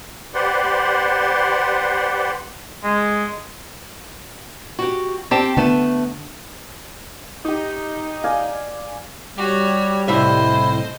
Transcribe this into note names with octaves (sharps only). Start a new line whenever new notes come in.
G4 B4 C5 D5 F#5 C6
G#3
F#4 G4
C4 G4 A5
D3 A3 B3 A5
D#4 G4 D#6
D5 F5 G#5
G3 F#4 G4 C#5
C2 A2 E4 C5 D#5 E5